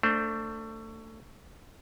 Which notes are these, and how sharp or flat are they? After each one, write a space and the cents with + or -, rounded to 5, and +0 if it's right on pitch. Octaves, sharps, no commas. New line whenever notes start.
A3 +25 D4 +0 C5 +0